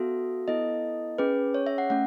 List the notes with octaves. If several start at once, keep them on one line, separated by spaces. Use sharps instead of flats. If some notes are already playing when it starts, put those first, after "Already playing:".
Already playing: B3 F#4 A4 E5
B3 E4 A4 D#5
C#4 G#4 B4
C#5
E5
F#5
A3 C#4 F#5